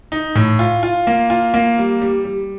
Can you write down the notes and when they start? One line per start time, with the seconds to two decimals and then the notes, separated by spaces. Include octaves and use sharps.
0.12 D#4
0.35 A2
0.59 F4
0.83 F4
1.07 A#3
1.30 F4
1.54 A#3
1.78 G3
2.02 G3
2.25 G3